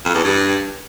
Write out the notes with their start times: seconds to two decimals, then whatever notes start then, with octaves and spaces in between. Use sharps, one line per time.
0.05 F2
0.15 E2
0.24 G2